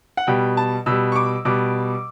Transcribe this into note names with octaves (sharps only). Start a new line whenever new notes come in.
F#5
B2 G3 G5
A5
B2 G3 E6
C#6
D6
B2 G3 D6